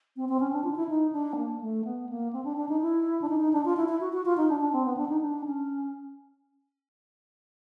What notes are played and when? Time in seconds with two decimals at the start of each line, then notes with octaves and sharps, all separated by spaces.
0.16 C4
0.29 C4
0.40 C#4
0.53 D4
0.64 F4
0.71 D#4
0.76 E4
0.89 D#4
1.12 D4
1.36 A#3
1.61 A3
1.85 B3
2.09 A#3
2.33 C4
2.45 D4
2.57 D4
2.69 D#4
2.81 E4
3.21 D4
3.29 D#4
3.40 D#4
3.53 D4
3.65 F4
3.77 E4
3.89 E4
4.01 F#4
4.13 F#4
4.26 F4
4.37 D#4
4.49 D4
4.61 D4
4.73 C4
4.85 B3
4.97 D4
5.09 D#4
5.21 D4
5.45 C#4